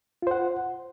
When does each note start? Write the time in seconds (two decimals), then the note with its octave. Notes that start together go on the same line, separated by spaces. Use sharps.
0.22 F4
0.27 C5
0.31 F#5